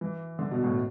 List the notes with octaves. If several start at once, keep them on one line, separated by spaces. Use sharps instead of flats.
E3
D3
B2
A2